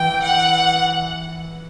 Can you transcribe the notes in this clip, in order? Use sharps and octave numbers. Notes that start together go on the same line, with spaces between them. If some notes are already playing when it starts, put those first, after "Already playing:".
Already playing: E3 G5
F#5